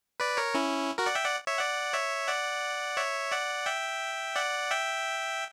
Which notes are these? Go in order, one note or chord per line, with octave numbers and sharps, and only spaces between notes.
B4 D5
A#4 C#5
C#4 E4
F#4 A#4
D5 F#5
E5 G5
D5 F#5
C#5 E5
D5 F#5
C#5 E5
D5 F#5
C#5 E5
D5 F#5
E5 G5
D5 F#5
E5 G5